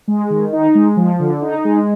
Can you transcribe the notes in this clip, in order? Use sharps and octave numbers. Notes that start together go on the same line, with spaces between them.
G#3
D#3
D#4
G#3
F3
D3
D#4
G#3